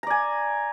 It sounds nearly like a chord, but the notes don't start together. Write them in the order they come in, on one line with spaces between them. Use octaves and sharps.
A#5 D5 G#5